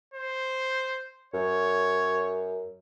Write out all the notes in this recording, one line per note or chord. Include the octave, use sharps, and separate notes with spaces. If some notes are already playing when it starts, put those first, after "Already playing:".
C5
F#2 C#5